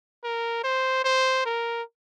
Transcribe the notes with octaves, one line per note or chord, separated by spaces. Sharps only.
A#4
C5
C5
A#4